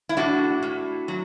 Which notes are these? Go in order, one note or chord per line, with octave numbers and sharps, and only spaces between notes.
E4
A2 D4 F#4
A2
F#3